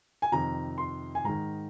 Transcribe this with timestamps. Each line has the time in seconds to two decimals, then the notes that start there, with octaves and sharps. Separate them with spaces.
0.22 G#5
0.32 F2 C3 D#3 A#5
0.78 C6
1.15 G#5
1.25 G#2 D#3 A#5